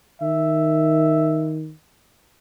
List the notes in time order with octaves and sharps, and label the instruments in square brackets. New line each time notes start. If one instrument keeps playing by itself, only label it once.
[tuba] D#3 [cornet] E5